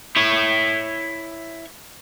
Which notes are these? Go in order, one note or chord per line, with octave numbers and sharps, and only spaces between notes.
E4 C#5